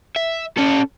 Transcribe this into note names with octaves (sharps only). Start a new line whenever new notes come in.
E5
C#4 A4